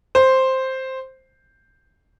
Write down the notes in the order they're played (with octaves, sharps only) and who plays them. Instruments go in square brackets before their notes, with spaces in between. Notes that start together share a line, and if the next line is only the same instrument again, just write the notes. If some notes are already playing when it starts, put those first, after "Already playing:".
[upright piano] C5